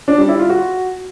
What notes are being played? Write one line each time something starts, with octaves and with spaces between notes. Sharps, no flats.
D4
G3
E4
F4
F#4